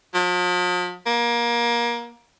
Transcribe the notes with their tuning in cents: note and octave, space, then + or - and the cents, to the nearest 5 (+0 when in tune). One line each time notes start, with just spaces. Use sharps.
F3 +45
A#3 +25